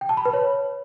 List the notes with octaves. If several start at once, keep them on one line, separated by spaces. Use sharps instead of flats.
G5
A5
B5
B4
C#5